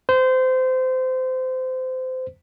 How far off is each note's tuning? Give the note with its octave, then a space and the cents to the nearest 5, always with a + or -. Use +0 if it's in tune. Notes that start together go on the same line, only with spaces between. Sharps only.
C5 -25